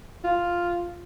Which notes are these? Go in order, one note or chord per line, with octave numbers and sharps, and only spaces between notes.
F4